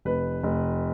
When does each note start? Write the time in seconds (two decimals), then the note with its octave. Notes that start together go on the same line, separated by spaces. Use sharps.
0.05 F1 B4
0.43 F1